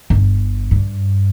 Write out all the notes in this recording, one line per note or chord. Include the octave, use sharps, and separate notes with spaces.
G1
G2